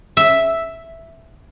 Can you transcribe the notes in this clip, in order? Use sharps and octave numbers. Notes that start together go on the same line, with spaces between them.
E5